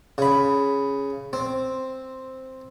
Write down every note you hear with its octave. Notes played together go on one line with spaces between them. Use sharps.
C#3 B5
C4